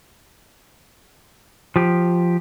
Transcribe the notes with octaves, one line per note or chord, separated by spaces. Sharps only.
F3 G4